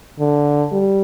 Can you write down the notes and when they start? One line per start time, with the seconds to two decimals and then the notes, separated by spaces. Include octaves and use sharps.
0.19 D3
0.72 G3